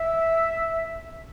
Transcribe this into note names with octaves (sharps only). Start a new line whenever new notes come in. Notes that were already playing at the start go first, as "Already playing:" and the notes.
Already playing: E5